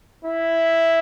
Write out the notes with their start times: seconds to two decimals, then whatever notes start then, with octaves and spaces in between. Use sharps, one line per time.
0.25 E4